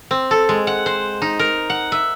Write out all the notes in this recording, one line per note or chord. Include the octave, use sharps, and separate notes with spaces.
C4
A4
G#3
F#5
C5
D#4
A#4
F#5
E5